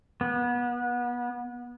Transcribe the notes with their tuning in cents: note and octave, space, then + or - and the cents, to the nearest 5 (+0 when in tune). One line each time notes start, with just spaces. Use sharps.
B3 -30